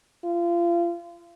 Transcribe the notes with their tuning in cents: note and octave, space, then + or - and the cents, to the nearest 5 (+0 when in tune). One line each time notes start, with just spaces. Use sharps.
F4 -30